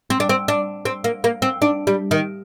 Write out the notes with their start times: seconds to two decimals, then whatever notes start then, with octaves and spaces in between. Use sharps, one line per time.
0.10 C4
0.20 D4
0.29 C4
0.48 D4
0.85 C4
1.04 A#3
1.24 A#3
1.42 C4
1.62 D4
1.87 G3
2.11 D#3